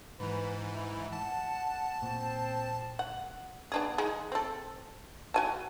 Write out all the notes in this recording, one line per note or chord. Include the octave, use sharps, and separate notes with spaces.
G#2 E3 B4
E4
F#5 A5
A#2 C4
F#5
B3 D4 G#4
G#3 D#4 G#4
C4 A4
F#4 G#5 A5